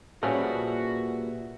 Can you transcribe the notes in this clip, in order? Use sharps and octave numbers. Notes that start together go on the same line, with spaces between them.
A#2 F3 G3 C#4 F#4 G#4 B4 E5